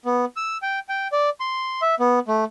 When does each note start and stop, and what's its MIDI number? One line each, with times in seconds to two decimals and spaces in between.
0.05 0.25 59
0.36 0.57 88
0.62 0.79 79
0.89 1.08 79
1.12 1.29 74
1.40 1.81 84
1.82 1.95 76
2.00 2.19 59
2.28 2.44 57